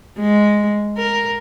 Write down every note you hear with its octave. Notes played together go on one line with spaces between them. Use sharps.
G#3
A#4